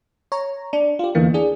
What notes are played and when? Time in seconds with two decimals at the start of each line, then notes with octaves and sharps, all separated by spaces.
0.32 C#5 A#5
0.73 D4
0.99 F4 G4
1.15 E2 D3 E3 A#3
1.34 D4 G#4